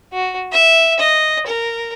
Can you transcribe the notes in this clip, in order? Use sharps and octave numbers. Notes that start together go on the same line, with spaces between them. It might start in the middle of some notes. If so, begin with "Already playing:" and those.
F#4
E5
D#5
A#4